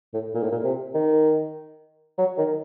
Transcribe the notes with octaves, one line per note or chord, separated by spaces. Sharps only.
A2
A#2
A2
A#2
C3
D#3
F#3
D#3